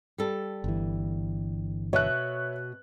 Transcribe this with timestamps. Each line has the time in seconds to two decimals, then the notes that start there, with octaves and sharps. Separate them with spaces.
0.18 G3 A4
0.64 G1 E3
1.93 B2 C#5 E5 F#6